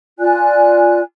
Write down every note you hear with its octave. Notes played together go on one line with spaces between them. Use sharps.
F4 D5 G#5 F#6